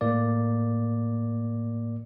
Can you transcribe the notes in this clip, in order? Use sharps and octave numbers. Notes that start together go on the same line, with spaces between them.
A2 A#3 D5